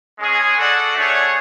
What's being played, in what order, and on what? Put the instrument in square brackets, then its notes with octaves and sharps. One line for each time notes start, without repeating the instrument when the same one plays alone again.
[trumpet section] G#3 C#4 G#4
F#4 A4 D5 F#5
A3 D4 G#4 C#5 F#5